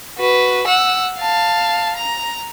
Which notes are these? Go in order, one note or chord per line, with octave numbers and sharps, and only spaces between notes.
F#4 B4
F#5 E6
F5 A5
A#5